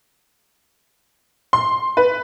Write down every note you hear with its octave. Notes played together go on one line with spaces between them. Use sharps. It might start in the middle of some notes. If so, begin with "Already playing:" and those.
C6
B4